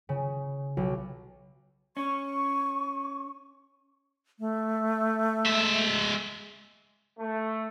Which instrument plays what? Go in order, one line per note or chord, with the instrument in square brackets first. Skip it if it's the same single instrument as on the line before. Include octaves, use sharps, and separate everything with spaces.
[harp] C#3
B1
[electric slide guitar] C#4 [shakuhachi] C#6
[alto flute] A3
[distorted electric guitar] G#3 E5
[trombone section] A3